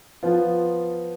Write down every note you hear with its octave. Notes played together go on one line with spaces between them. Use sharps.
F3 B3 F4